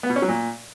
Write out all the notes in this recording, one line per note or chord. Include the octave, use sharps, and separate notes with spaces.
B3
B2
C#4
F#3
A#2